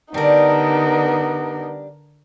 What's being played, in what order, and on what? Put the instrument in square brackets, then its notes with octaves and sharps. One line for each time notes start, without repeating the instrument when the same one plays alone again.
[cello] D3 A#4 [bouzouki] G3 D4 [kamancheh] B3 D#4